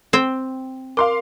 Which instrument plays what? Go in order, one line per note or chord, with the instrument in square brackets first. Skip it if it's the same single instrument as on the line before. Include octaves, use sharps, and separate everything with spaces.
[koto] C4 G5
[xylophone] A#4 [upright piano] F5 C6 D6